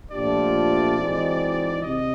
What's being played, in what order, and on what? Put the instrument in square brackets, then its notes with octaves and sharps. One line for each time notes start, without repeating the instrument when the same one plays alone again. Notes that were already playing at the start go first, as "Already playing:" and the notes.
[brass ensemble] A#2 F3 A3 D4 G4 [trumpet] D5
[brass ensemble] E3 G#3 C4 D#4 F#4
[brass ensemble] C3 [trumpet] D#5